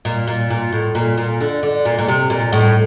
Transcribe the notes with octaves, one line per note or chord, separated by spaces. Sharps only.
A#2
A#2
A#2
A2
A#2
A#2
D3
D3
A#2
A#2
C3
A#2
A2